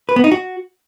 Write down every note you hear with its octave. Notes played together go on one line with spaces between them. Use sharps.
B4
B3
D#4
F#4